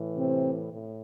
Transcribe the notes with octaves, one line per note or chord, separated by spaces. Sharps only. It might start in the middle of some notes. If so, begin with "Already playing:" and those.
Already playing: A2 E3
C3 C4
A2